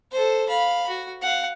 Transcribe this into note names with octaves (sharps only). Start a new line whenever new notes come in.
A4 C5
F5 B5
F#4
F5 F#5